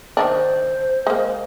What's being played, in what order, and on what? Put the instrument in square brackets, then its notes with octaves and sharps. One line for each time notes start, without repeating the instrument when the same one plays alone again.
[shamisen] D#3 E3 D4 [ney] C5
[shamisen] G#3 A#3